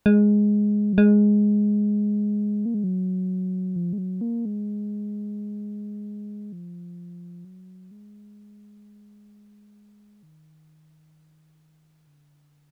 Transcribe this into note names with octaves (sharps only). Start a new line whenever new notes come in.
G#3
F#3
G#3
A#3
G#3
F#3
F3
G#3
F#3
A#3
G#3
F3
F#3
G#3
D#3
D3